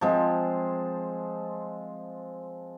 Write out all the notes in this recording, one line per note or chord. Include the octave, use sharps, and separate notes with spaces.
F3 G#3 C4